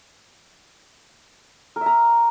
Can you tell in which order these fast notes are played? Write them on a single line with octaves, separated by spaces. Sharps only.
A#4 E5 A#5